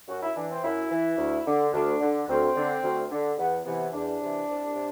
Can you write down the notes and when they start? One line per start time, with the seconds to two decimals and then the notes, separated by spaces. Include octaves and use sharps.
0.08 F#2 F#4
0.21 E4
0.35 E3 D4
0.50 C4
0.63 F#2 E4
0.90 E3
1.17 D2
1.46 D3
1.72 D2 D4
2.00 D3
2.28 D2 C4
2.55 D3
2.83 D2
3.11 D3
3.38 E2 B3
3.65 C3 E3 B3
3.93 E2 D4
4.21 C3 E3
4.49 C2
4.76 C3